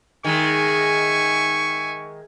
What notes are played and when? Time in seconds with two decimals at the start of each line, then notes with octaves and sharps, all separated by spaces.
0.25 D#3 G#3 E5 G#5 C#6